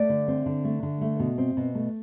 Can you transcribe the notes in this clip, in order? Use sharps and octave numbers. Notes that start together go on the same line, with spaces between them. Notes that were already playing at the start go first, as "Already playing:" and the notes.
Already playing: A3 D5
D3
C4
D3
A3
D3
A3
B2
C4
B2
A3